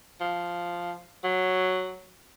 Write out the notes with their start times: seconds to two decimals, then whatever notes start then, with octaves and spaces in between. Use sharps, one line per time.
0.21 F3
1.24 F#3